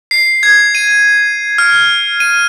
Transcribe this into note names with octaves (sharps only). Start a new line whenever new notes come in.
C7
G#6
D#7
F6
D#7